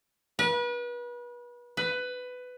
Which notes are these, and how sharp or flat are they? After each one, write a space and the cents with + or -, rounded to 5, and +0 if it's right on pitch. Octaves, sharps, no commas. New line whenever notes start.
B4 -35
B4 +15